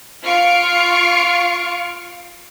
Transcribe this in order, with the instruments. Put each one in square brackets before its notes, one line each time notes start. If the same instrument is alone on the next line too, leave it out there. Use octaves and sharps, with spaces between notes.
[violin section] F4 C#6 F6 C7 D7